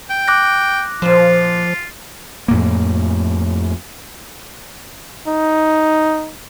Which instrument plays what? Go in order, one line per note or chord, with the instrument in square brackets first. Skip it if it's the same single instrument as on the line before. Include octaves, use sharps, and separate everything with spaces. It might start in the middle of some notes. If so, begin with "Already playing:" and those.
[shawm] G5
[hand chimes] D6 F#6 A#6
[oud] A#2 C5 [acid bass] F3 [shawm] F4
[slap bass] F2 A2 A#3
[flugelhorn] D#4